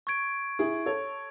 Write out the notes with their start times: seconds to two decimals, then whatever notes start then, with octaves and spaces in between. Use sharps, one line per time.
0.07 C#6 G#6 D7
0.59 E4 G#4
0.86 A4 C#5